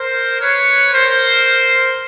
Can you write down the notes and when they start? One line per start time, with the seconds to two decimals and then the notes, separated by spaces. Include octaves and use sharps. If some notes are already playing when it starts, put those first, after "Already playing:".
Already playing: A#4 C5
0.41 B4 C#5
0.94 A#4 C5